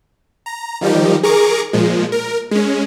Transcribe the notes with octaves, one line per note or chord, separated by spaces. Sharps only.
A#5
D#3 F3 G3 D#4 G4
G#4 A#4 A#5 C#6 D6
A#2 F3 G#3
A#4
G#3 C#4